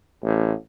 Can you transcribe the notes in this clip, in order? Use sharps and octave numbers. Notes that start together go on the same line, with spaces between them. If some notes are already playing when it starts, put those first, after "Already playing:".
A1